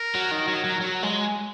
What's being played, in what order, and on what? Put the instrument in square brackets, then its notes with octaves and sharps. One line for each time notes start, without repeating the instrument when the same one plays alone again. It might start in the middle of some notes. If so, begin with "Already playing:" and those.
Already playing: [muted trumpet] A#4
[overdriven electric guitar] F#3
D#3
F#3
F#3
F#3
G#3